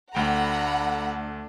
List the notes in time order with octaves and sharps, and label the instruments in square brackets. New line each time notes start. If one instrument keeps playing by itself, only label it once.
[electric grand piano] D2 G5 [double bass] A3 D4 [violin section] F#5 A#5 B5